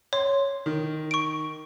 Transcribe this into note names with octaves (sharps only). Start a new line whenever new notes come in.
C#5 C6
D#3
C#6 D7